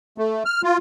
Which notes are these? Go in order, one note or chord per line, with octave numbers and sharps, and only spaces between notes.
A3
F6
F4